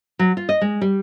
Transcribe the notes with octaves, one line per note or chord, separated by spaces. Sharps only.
F#3
F4
D#5
G#3
G3